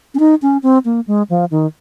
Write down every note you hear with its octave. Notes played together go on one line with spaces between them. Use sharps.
C#4
D#4
C#4
C4
A#3
G#3
F3
D#3